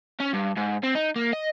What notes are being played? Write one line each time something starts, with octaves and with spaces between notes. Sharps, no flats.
C#4
G2
G#2
C4
D#4
A#3
D#5